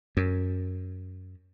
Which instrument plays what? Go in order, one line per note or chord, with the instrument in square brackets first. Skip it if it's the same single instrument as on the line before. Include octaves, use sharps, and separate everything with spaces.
[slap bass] F#2